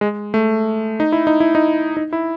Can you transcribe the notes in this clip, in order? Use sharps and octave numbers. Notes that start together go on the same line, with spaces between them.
G#3
A3
D#4
E4
D#4
E4
D#4
D#4
E4